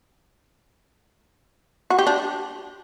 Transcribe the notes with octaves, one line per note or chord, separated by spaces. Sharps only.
F#4
G4
D4